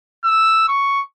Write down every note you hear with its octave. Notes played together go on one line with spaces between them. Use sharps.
E6
C#6